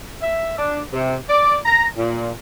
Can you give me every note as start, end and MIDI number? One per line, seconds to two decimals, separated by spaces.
0.22 0.57 76
0.58 0.80 62
0.93 1.15 48
1.29 1.57 74
1.65 1.85 82
1.97 2.29 46